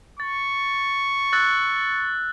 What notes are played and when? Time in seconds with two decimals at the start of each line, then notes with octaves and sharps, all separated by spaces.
0.20 C#6 A6
1.32 E6 F#6 A6